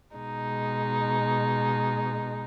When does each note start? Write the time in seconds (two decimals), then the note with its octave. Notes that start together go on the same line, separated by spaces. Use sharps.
0.16 B2 G#3 D#4